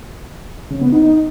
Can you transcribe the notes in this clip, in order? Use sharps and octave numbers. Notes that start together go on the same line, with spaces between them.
C#3
B3
D#4